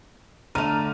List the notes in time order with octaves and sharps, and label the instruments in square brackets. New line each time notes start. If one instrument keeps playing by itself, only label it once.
[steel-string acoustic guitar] D3 A3 [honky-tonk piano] A#5 F6 D#7